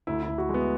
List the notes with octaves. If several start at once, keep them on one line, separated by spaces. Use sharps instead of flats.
D2 E4
E4
D2
F#4
G#3
B3